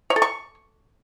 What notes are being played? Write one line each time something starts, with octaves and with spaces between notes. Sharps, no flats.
C#5
A4
C#6